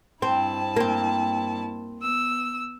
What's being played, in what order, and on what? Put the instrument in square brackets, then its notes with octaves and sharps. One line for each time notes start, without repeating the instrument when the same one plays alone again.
[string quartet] G2 E4 A5 [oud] C4
[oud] A#3 C4
[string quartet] B3 E6